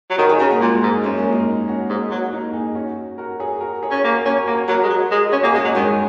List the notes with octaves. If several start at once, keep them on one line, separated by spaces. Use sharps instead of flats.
F#3
D#3 F#4 A#4
G#4 C#5
C#3 F#4 A#4
A#3
A#2 G#3
G#2
F#2 A#3
G#3 C#4
A#3 D#4
C#4 F#4
G#2 A#3
F#3
A#3 D#4
D#4 G#4
C#4 F#4
F#4 A#4
G#4 C#5
F#4 A#4
G#4 C#5
C#4
A#3 F#4 A#4
C#4 F#4 A#4
A#3 F#4 A#4
F#3 F#4 A#4
G#3
F#3
G#3
C#4 F#4
A#3 G#4
G#3 C#4 F#4
F#3
D#3 G#3 C#4